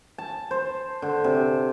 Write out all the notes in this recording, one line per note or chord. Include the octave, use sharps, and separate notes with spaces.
A5
C5
D3
C3